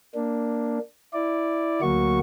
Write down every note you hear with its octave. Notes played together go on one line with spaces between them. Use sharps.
A#3 D4
E4 D5
D2 F#3 A#3 F#4 C#6